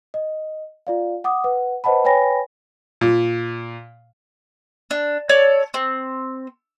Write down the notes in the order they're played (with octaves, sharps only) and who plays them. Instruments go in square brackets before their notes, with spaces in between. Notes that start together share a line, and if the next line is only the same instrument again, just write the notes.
[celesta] D#5
F4 D5 F5
F#5 D6 D#6
B4 F#5
B4 C5 D#5 F#5 A5 B5
B4 C#5 G5 G#5 B5 A#6
[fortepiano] A#2
[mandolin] D4
A4 C#5 D5
C4